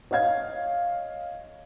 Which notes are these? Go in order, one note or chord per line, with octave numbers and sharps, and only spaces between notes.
C#5 D#5 F5 G#6